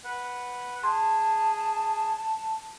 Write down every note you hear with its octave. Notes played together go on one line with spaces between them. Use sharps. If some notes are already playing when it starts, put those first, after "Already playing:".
B4 F#5
G#4 A5 C6